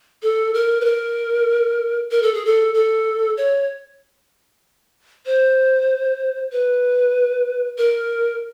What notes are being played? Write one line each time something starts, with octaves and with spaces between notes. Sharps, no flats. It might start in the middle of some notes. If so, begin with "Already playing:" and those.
A4
A#4
B4
A#4
A#4
A4
G#4
A4
A4
C#5
C5
B4
A#4